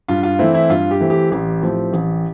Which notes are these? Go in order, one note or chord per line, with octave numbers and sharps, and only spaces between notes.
G2 F4
F4
E3 A3 C4 E4
E4
G2 F4
G4
E3 A3 C4
G4
A1 G4
A2 F3 C4
A1